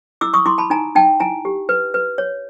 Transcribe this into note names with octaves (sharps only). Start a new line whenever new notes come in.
E4 D6 E6
C#6 D#6
E4 C6 D6
A5 B5
D#4 G#5 A#5
D#4 G5 A5
E4 G#5 A#5
G4
B4
B4
C#5